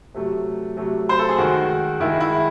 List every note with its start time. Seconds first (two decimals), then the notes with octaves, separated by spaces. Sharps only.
0.14 C3 F#3 A3
0.77 C3 F#3 A3
1.09 C5
1.19 A4
1.29 G#4
1.38 D#3 G#3 F#4
2.00 D#3 E4
2.04 G#3
2.20 E4